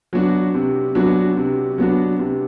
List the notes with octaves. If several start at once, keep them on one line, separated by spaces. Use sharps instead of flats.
F#3 B3 D4 F#4
C3
F#3 B3 D4 F#4
C3
F#3 B3 D4 F#4
C3